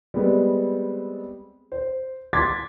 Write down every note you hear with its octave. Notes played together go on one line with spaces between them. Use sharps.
G3 G#3 B3 C4
C5
C6 D6 G#6 A6 B6